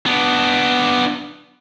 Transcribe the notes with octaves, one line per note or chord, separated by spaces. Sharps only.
B3 D4